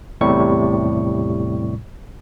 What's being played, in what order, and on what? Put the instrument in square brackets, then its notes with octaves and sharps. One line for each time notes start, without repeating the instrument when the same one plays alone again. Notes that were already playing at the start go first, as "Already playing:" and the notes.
[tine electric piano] E2 A2 C3 G3 C#6